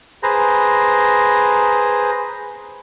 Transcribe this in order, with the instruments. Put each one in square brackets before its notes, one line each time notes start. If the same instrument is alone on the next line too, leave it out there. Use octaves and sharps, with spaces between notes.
[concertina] G#4 B4 C5 A#5